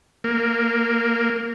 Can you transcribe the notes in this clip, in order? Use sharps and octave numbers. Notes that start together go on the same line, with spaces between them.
A#3